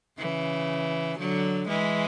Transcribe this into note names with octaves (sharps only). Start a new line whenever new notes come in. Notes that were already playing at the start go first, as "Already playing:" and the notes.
C#3 E3
D3 F#3
E3 G#3